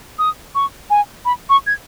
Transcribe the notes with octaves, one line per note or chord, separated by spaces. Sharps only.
D#6
C#6
G#5
B5
C#6
G#6